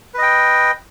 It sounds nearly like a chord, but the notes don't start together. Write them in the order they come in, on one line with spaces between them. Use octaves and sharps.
B4 D#5 G5